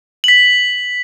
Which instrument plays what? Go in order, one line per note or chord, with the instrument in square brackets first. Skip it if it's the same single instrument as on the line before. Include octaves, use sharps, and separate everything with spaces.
[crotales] B6 F#7